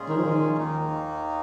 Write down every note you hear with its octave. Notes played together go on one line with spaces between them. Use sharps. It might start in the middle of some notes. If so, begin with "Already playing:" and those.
Already playing: A#2 G#3 C#4 F4 G#4
D#3
F3
D#3
D#2 D#3 A#3 D#4